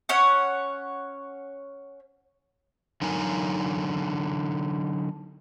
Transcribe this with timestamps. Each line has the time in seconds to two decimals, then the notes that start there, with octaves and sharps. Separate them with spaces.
0.09 C#4 C#5 F#5
3.02 D3 F#3 D#4 A#4 G#5